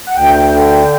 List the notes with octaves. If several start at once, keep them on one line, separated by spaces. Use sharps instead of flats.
F#5
D2 G5
D3